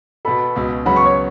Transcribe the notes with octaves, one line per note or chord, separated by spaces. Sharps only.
B2 B3 A4 B5
C#2 B2 B3
C#2 C#3 F#3 B3 F#4 B5
C#6
C#5